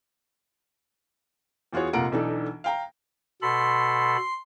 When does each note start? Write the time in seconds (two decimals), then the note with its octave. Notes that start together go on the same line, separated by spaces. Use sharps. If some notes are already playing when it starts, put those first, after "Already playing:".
1.73 E2 F4 F#4 G#4 C#5
1.93 F1 A#2 F4 F#5 A#5 D7
2.12 B1 E3 D4 D#4 A4
2.64 F5 G5 A#5
3.42 B2 A4 B5 C6